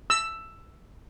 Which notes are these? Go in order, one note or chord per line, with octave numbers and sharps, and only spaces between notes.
E6